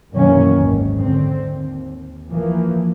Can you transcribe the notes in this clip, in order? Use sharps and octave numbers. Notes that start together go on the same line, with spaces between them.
F#2 B2 D#3 E3 A#3 C#4
G#1 D#2
D3 C4
D#2
E3 F3 A#3